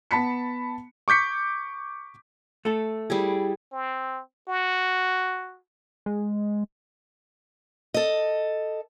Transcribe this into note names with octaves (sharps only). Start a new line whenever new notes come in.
B3 A5 B5 B6 C#7
C#6 D6 G6 B6 C#7
A3 A4
G3 E4 G#4
C4
F#4
G#3
A4 D#5